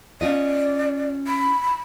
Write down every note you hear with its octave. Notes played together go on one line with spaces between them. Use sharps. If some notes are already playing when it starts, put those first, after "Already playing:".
C#4 F4 D5 D#5
B5